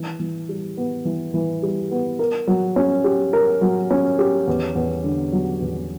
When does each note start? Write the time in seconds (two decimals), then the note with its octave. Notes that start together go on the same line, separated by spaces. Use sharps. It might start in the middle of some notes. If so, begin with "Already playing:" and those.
Already playing: E3
0.19 E3
0.49 G3
0.77 B3
1.05 E3
1.34 E3
1.63 G3
1.91 B3
2.19 A#4
2.47 F#3
2.76 C#4
3.04 G4
3.33 A#4
3.61 F#3
3.90 C#4
4.19 G4
4.47 E2
4.75 E2
5.04 D3
5.32 F#3
5.61 E2